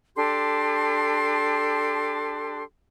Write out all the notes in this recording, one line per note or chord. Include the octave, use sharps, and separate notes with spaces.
D4 G4 A4 C6